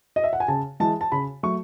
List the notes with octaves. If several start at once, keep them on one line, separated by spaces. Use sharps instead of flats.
D#5
E5
F#5
G#5
C#3 A5
E3 G#3 A5
A5
C#3 B5
F#3 A3 C#6